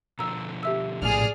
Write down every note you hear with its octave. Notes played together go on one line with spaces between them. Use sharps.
B2 D3 F3 A#5 E6
G4 E5 E6
A#1 A2 G#4 D5 F6